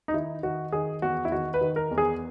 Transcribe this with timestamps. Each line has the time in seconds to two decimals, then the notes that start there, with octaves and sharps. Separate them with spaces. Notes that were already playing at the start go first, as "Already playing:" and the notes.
0.08 D#4
0.14 D#3 E4
0.43 D#3 F#4
0.72 D#3 G#4
1.02 E2 F#4
1.25 E4
1.32 D#3 F#4
1.54 B4
1.61 D#3
1.76 A#4
1.91 E2
1.98 G#4